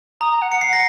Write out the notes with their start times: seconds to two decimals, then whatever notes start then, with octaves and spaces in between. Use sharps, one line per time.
0.21 A#5 D#6
0.31 A#5
0.41 F#5
0.52 F#5 C#7
0.61 C7
0.67 F#5
0.73 A#6